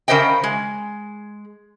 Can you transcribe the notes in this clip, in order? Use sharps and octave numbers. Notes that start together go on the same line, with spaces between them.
C#3 A#4 C5 D#5 G5
G#3